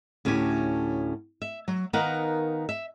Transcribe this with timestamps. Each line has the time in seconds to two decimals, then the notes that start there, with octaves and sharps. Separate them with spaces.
0.25 D2 A2 C#4 G4 G#5
1.42 E5
1.68 F#3
1.93 D#3 B3 D#4 A#4 F5 F#5
2.69 E5